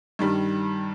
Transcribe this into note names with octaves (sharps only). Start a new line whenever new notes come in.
G2 D#3 G3